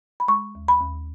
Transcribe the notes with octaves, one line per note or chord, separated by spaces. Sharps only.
B5
G#3 C#6
D#2
B5
D#2